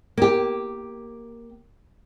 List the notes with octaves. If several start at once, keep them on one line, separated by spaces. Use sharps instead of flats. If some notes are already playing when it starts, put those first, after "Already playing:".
A#3 G4